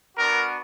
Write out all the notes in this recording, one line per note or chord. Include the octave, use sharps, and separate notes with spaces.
B3 D4 F#4 A#4